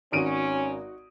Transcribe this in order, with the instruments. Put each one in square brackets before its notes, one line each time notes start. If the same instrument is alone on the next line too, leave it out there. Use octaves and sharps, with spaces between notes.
[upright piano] G#1 D7 D#7 [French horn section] C#4 [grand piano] D#4 F#4